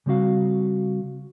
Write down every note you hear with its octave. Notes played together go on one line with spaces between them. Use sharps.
C#3 G3 C4 F#4 F5